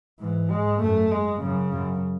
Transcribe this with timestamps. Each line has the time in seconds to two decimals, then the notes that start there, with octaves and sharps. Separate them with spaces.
0.20 G#2 E3
0.50 G#2 G#3
0.81 F#2 A3
1.11 G#3
1.41 F#2 C#3
1.72 F#2